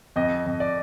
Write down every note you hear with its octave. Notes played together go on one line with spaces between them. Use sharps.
F2 D#5
F2
D5